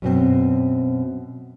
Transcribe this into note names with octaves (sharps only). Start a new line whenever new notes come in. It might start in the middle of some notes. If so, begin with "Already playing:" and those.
F#2 B2 C4